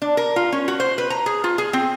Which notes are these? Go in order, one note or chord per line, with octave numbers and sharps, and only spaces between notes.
D4
A#4
F4
C#4
F#4
C5
B4
A#5
G#4
F4
G#4
C4